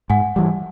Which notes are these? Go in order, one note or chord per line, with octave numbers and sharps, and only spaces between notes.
G#2 F#5 G#5
E3 G3